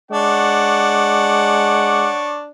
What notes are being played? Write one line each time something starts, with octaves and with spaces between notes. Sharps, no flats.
G#3 D4 C#5 F#5 C#6 D6